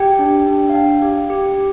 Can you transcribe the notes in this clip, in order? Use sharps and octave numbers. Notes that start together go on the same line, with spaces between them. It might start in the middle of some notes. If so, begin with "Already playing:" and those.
Already playing: G4 G5
D4
D4
F5
D4 G5
G4
G4